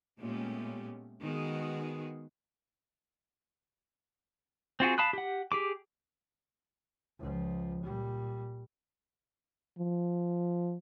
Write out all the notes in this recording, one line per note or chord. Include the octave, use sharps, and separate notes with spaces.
A#2 G#3 A3 B3 C#4 G4
D#3 G#3 B3 F#4 G#4
C4 F4 F#4 G#4
F5 A5 B5 D#6 F#6
G4 F#5
G4 G#4 D6
C#2 F3
A#2 G3
F3